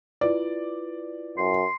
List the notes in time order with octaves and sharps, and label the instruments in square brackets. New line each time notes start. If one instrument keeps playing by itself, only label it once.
[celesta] E4 F4 B4 [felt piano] D5
[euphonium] F#2 [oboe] C6